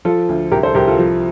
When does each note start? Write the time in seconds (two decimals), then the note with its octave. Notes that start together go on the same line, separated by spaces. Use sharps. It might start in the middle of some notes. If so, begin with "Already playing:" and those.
0.05 F3 F4 A4
0.29 D2
0.51 C2 G4 A#4
0.63 A4 C5
0.75 C2 G4 A#4
0.87 F4 A4
0.99 F3